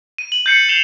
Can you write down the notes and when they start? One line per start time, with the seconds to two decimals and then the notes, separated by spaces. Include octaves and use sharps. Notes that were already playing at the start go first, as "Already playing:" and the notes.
0.18 D#7
0.32 F#7
0.46 G6 A6 C7 C#7
0.69 G6 C7 E7 F7 G7